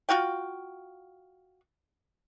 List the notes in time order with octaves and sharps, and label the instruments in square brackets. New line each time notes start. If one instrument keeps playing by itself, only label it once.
[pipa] F4 F#4 F5 G5